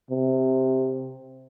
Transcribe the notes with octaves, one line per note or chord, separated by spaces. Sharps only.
C3